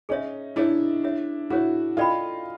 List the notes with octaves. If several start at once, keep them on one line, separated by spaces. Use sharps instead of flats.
C#4 D#4 G#4 C#5 E5
D4 E4 G#4 C#5 E5
G#4 C#5 E5
E4 F#4 G#4 C#5 E5
D#4 F4 A4 D5 G5 B5